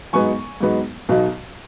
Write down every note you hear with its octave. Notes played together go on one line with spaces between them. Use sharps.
G#2 F#3 B3 D#4 G#5 C#6
G#2 F#3 B3 D#4
B1 B2 F#3 D#4